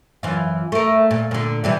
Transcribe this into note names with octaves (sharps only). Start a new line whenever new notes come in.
F#2 E3 F4
A3 A#4
A#2
A#2 D3
C3 E3 G3